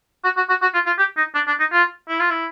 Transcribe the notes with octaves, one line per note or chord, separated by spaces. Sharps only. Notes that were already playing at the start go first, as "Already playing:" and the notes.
F#4
F#4
F#4
F#4
F4
F4
G4
D#4
D4
D4
D#4
F4
E4
F4
E4